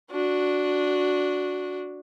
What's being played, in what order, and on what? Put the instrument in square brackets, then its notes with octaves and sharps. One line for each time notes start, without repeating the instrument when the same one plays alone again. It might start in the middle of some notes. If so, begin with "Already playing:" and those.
[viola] D4 F#4